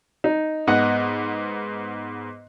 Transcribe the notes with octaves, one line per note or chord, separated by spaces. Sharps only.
D#4
G#2 B3 D#5 F#5